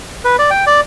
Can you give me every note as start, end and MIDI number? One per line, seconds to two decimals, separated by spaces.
0.24 0.36 71
0.39 0.50 74
0.51 0.65 79
0.67 0.81 74